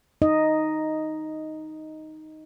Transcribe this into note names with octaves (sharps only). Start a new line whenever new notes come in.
D#4 D#5